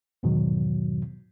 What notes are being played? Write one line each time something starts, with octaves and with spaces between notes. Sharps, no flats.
E2 G#2 B2 D#3 F#3